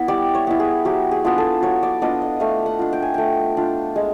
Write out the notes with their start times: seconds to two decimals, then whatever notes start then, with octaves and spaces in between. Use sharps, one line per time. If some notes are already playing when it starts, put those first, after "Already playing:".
Already playing: B3 E4 E5
0.08 G3 D5
0.34 C#5
0.47 B3 E4
0.59 G#4
0.85 F#3 G4
1.11 G#4
1.24 B3 D4 F4
1.38 A4
1.62 F#3 C#5
1.83 D5
2.02 B3 D4 F4 D#5
2.22 D#5
2.40 A3 F5
2.66 F#5
2.79 D4 F4
2.93 G5
3.02 G#5
3.14 A3 G5
3.57 D4 F4
3.96 G#3